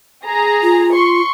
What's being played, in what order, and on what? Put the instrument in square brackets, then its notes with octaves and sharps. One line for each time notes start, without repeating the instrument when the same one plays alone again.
[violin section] G#4 A#5
[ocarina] F4
[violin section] C6 C#6